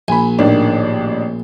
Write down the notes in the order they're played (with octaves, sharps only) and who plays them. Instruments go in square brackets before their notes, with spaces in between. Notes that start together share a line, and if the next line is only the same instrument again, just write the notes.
[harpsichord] A#1 [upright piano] G#5 B5
[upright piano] A1 D#3 D4